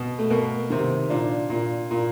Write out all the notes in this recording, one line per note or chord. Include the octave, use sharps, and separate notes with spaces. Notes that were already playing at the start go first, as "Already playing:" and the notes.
Already playing: B2 B3
A3
B2 A#3
C3 D#3
A#2 D4
A#2
A#2